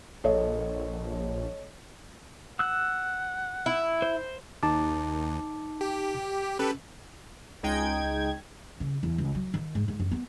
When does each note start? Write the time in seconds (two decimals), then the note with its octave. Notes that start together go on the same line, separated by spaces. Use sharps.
0.24 A#1 A4 C#5 D#5
2.59 F#5 E6 F#6
3.66 E4
4.02 C5
4.63 D#2 D#4 A5 D6
5.81 G4
6.59 C#4 G4 A4 B4
7.63 C#2 G#3 D#4 G5 G#6
8.80 C#3
9.03 E2
9.18 C#2
9.35 F#3
9.54 D#3
9.75 G#2
9.88 G#2
10.00 F#2
10.11 B3